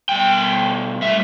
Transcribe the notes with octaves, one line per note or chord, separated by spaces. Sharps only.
B2 G3 G5
A2 G3 E5